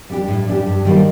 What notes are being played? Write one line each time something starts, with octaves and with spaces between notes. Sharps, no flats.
G3 D4 G4
A2
G3 D4 G4
G2
D#3 G3 A#3